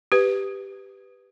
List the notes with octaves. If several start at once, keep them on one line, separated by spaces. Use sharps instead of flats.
G4 B4